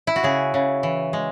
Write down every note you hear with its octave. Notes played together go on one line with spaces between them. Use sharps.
E4
F#4
C#3 G#4
C#3
E3
G#3